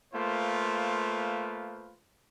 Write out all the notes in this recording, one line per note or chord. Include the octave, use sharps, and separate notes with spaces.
A3 A#3 F4 B4 C5